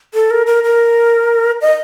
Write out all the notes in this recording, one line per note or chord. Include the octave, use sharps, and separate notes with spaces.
A4
A#4
A#4
A#4
D#5